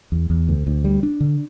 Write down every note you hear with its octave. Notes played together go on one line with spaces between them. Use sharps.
E2
E2
D2
D2
G3
D4
D3